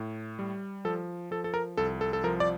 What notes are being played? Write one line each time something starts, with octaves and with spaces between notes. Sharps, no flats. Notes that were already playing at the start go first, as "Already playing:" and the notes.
Already playing: A2
G3
F3 A4
F3 A4
A4
A#4
C2 A4
A4
A4
F3 A#4
D5